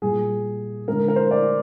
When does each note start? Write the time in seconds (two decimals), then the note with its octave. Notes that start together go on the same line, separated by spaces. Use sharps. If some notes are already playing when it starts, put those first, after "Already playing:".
0.02 A#2 G3 G#4
0.88 D3 G#3 A#4
1.08 A#4
1.16 C5
1.31 D5